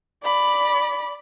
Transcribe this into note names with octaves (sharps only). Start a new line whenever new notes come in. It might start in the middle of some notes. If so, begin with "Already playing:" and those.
D5 B5